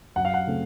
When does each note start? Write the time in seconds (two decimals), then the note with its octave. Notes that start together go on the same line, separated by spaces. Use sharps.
0.16 F#2 F#5
0.25 F5
0.34 F#5
0.47 C#3 A3 C4